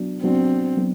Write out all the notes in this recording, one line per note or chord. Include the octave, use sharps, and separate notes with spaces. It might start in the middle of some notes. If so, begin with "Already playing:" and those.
Already playing: F#3 B3 D4 F#4
F#3 B3 C4 D4 F#4
F#3 B3